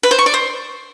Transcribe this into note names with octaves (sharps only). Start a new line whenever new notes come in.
B4
C5
C#6
D5
C5